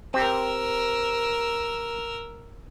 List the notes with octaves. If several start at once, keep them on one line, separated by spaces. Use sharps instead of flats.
C4 G4 A#4 E6